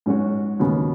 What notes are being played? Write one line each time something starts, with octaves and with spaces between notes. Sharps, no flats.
G#2 F#3 C#4 F#4
D#2 C#3 F#3 B3